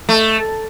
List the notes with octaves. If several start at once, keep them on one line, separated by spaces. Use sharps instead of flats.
A3